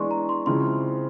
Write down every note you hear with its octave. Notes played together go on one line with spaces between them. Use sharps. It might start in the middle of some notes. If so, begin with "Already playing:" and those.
Already playing: E3 G#3 B3 D4 C6 C#6
A#5
C6
C#3 F3 G#3 C4 E4 C6